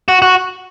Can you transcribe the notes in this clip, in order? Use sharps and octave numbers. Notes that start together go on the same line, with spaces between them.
F#4
F#4